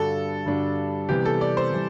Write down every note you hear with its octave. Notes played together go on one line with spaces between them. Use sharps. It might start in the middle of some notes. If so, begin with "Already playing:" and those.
Already playing: G2 D3 G3 D4 F#4 A4
G2 D3 G3 D4 F#4
C3 E3 G3 B3 G4
A4
D5
C5
C3 E3 G3